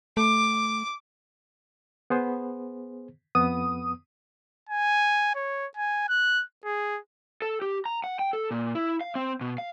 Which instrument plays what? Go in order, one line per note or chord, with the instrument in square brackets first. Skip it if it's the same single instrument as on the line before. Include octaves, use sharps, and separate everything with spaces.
[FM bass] A3 [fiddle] D6
[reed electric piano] B3 G#4 C5
[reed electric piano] F2 B3 [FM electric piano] D#6
[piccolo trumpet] G#5
C#5
G#5
F#6
G#4
[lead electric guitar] A4
G4
A#5
F#5
G5
A4
A#2
E4
F5
C4
B2
F5